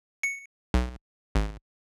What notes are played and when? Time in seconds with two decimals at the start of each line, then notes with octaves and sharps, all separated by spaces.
0.23 C#7
0.74 B1
1.35 G#1